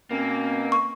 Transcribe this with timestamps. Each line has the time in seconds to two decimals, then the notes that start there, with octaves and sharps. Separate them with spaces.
0.11 B2 A#3 C4 C#4
0.72 C#6